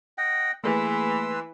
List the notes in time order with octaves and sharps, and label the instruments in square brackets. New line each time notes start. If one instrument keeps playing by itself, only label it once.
[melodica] D#5 F#5 G5
[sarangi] E3 [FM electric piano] A3 A#3 G#4 [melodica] B4 C6 E6